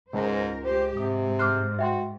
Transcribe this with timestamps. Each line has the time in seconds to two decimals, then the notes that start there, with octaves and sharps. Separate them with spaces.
0.13 C#2 G#2 A#4 C5
0.64 G#3 G4 C5
0.97 G#2 C3 D#6
1.39 C5 D6 F6 F#6
1.79 F#4 E5 G5 C6